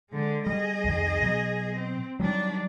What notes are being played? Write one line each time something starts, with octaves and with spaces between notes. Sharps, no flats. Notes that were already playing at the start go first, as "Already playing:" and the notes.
D3 G#3
G3 G#4 D#5
C2 F2 D#3
B2 F#3
C4
D#3 F#3 G3 D4